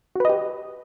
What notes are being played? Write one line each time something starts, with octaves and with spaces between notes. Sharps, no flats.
F#4 G4 B4 D#5